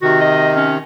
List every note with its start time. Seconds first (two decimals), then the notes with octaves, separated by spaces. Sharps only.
0.02 C3 D#3 F#4
0.21 D#5
0.56 C#4